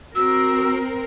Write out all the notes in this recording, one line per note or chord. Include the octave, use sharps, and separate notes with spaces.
C4 F#4 A#4 E6